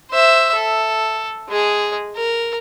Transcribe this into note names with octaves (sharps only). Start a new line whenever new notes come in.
C5 E5
A4
G#3 G#4
A#4